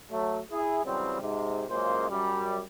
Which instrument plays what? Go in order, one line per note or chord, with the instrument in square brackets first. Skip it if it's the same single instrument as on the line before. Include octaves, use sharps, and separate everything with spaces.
[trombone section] F#3 A3
E4 G#4
C#3 E3 F#3 G3 C4
G#2 C3
F#2 A#2 C#3 G#3 A#3 C5
F#2 G3